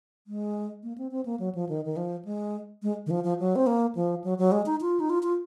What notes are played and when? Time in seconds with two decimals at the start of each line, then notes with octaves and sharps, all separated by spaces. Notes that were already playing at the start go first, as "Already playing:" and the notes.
0.27 G#3
0.83 A#3
0.98 C4
1.11 C4
1.25 A#3
1.39 F#3
1.55 F3
1.69 D#3
1.85 D#3
1.97 F3
2.25 G#3
2.83 G#3
3.06 D#3
3.11 F3
3.24 F3
3.39 F#3
3.56 C4
3.67 A#3
3.95 F3
4.24 F#3
4.38 F#3
4.52 G#3
4.66 D#4
4.81 F4
5.00 D#4
5.10 F4
5.23 F4